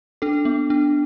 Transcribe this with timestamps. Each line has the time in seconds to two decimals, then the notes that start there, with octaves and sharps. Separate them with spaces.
0.22 D4 A4
0.45 B3
0.70 D4